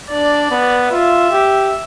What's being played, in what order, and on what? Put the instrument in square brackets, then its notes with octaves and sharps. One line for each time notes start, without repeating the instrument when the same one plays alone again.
[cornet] D4 [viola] D5
[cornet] B3
[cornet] F4 [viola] E5
[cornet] G4